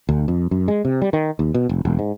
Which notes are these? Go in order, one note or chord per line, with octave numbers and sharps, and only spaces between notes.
D2
F2
F#2
G#3
C3
G3
D#3
D#2
B2
F1
E1
G#2